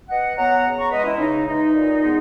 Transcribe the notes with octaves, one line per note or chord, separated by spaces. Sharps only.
B2 D#5 F#5
F#3 B3 F#5 A#5
C#3
A#5 C#6
E3 G#3 B4 D#5
C#4 E4
C#3 D#4
E3 G#3 D#4
A#2
G#3 B3